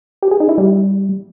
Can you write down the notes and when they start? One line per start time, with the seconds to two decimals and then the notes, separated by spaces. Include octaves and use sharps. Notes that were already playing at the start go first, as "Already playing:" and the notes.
0.23 G4
0.31 G#4
0.40 D#4
0.49 E4
0.58 G3